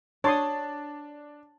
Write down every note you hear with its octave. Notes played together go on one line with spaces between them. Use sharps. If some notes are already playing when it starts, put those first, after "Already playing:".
D4 C#5 A5 C6 D#6